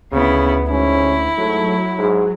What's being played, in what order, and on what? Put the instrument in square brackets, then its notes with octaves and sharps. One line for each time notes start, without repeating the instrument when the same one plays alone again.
[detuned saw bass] D2 [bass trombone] C#3 [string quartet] B3 E4
[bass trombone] G#2 [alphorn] C#4 [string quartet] E4
[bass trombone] G#2 [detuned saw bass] F#3 [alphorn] A3
[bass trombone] G#2 [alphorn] G#4